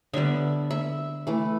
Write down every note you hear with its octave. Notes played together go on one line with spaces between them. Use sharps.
D3 G3 B3 E5
E5
E3 A3